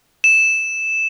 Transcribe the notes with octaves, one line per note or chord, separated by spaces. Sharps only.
E7